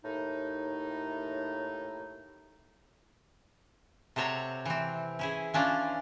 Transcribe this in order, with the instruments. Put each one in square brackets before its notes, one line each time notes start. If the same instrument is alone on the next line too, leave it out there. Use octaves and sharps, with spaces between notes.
[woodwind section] D#2 A2 D#4
[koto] C3 A4 C5 C#5 F#5 A#5
E3 C4
C#4 E4 G#4
E3 C#4 D4 F4